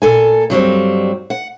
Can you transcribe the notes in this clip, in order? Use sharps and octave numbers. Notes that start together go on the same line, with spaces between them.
A#2 A4 G#5
G2 F#3 G3 C4
F#5